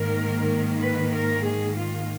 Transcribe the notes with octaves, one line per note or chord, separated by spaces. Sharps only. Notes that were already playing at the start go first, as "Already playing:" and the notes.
Already playing: G#2 D#3 A#3 A#4
B4
A#4
G#4
F4